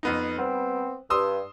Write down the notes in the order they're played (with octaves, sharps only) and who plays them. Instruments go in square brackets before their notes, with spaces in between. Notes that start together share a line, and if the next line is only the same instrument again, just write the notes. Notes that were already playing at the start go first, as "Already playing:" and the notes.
[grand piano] F2 B3 D#4
[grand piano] G3 [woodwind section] B3 C4
[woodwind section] G2 [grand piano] C6 D#6 E6